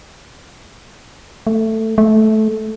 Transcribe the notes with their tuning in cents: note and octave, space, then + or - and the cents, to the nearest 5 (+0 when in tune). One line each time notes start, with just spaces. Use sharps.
A3 +10
A3 -15